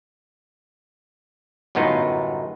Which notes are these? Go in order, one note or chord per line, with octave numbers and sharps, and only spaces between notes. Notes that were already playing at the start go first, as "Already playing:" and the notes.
G1 F#2 A2 B3 D#4 F4